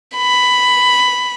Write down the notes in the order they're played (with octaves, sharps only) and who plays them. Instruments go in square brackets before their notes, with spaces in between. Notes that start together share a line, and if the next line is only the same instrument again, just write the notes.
[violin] B5